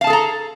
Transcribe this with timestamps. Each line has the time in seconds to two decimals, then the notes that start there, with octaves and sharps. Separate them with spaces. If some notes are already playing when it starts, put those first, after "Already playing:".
0.01 F5
0.04 A5
0.07 G#4
0.10 A4
0.13 A#5